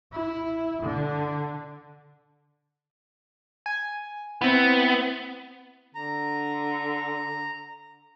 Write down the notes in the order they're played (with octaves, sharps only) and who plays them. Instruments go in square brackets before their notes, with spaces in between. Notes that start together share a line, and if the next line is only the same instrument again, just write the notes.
[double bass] E4
D3
[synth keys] G#5
[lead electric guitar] B3 [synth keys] C4 E4
[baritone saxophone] D3 [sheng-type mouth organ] A#5